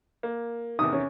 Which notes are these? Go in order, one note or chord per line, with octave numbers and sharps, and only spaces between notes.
A#3
E2 C3 D#3 D#6
C#4